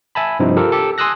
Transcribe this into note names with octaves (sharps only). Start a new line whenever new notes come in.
E5 G#5 A5 B5
G2 C3 F3 C4 D#4 E4
F4 G4 A4 A#4
G4 A4
G#5 C6 D#6 E6 F#6 A#6